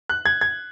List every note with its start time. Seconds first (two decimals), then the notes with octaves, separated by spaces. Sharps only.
0.09 F#6
0.26 G#6
0.41 G#6